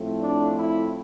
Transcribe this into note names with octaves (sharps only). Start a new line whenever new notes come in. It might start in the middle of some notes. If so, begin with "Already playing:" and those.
Already playing: A2 F3 A3 C4
D4
E4